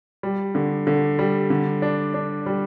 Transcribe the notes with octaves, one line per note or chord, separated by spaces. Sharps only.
G3
D3
D3
G3
D3
D4
D4
G3